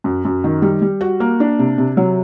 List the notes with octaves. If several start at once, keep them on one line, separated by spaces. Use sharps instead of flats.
F#2
F#2
D#3
G3
G3
F#4
A#3
D4
C3
C3
F#3